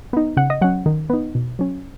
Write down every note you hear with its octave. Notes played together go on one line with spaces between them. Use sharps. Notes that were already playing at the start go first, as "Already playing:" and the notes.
B3 D#4
C#3 F#5
D#5
F#3 C#4 F#5
D#3
B3 D#4
B2
F#3 C#4